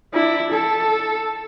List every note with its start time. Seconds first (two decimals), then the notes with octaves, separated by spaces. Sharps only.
0.14 D4 E4
0.52 A4